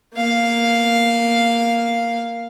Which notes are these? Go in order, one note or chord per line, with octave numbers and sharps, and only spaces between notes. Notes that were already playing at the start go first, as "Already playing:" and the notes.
A#3 F5